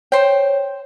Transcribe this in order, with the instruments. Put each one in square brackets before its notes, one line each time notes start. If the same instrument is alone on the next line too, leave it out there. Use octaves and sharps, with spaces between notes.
[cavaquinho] C5 G5 [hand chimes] C#5